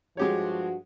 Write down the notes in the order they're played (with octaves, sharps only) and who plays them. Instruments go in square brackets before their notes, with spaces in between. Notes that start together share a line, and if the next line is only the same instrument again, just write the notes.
[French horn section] G2 F3 F#4 [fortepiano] G#3 G4 C#5